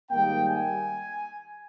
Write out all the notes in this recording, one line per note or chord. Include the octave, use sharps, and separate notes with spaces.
G#2 D#3 G3 A#3 D#4 G5
G#5